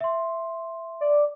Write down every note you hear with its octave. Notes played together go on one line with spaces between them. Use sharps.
E5 C6
D5